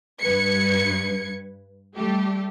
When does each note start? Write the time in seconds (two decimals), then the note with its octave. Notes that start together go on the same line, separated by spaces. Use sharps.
0.20 G2 B4 G#6 C#7
1.96 G3 A3 G4